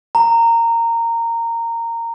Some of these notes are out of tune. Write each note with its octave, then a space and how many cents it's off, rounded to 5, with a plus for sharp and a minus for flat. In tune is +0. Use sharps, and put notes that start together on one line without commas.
A#5 -15